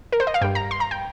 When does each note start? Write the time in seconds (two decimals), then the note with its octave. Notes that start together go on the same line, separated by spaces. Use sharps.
0.12 A#4
0.20 C5
0.27 D#5
0.34 F5
0.41 G2 G3 G5
0.55 A#5
0.71 C6
0.80 A#5
0.91 G5